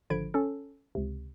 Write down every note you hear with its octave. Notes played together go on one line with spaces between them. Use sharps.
G#1 D3 F3 B5 G#6 D7
C#4 A4
C#2 C3